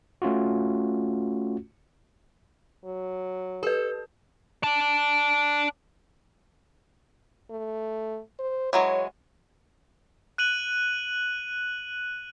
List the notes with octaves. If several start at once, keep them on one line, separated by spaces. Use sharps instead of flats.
A3 C#4 F4 F#4
F#3
G4 A4 B4
D5 A5
A3
C5
E3 F#3 G#3 C#5
F#6 D#7 F#7